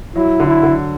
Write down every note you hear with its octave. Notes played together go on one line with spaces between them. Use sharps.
F#3 E4
D3
E4
D3